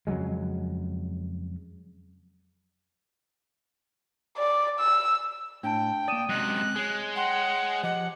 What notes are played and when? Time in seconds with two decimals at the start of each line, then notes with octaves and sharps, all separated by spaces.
0.07 F2 C#3 F#3 G#3
4.38 D5
4.80 E6
5.63 A2 D4 G5 A5
6.08 A#3 D5 D#6 D#7 E7
6.29 F#2 C3 G#3 C4 D#5 F#6
6.76 G#3 G#4 C#5
7.16 F#5 G5 C6
7.83 F3 G4 D#5 F#5